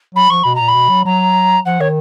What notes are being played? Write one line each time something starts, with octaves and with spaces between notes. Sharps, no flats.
F#3 B5
F3 C#6
B2 B5
A#2 A#5
B5
B2
F#3
F#3 A#5
F3 F#5
D#3 C#5